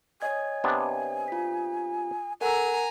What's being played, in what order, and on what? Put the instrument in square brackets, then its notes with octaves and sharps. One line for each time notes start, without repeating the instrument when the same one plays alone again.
[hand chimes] C#5 D#5 G#6 [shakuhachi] G#5
[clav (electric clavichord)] C3 B3 D4
[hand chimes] F4 B6
[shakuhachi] A4 [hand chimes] A#4 F#5 [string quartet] G#5 A#5